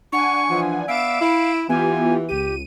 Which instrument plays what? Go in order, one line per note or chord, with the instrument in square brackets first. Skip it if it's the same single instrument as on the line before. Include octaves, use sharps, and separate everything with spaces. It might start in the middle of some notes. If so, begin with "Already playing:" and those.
[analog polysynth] D4 F#5 G#5 [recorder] C#6
[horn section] E3 F3
[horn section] B3 D5 E5 [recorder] F5 [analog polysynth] D7 E7
[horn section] E4
[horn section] E3 [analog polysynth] B3 F4 G4 [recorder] G#5
[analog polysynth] C#2 D#7 [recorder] G4